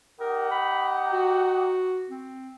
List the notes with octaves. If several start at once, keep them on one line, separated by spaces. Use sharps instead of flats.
D#4 G4 A#4 F#5
B5
F#4
C4